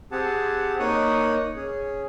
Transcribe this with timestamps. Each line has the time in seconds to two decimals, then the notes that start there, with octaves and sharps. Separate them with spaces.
0.12 C4 G4 G#4 F#5 A5
0.80 A#3 D#4 C#5 C#6 D#6 F#6
1.56 C#4 G#4